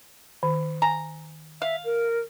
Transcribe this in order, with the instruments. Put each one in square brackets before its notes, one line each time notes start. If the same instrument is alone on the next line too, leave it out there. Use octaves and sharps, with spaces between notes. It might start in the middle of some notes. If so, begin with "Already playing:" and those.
[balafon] D#3
[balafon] G#5 [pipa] A#5
[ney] E5 [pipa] F5
[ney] A#4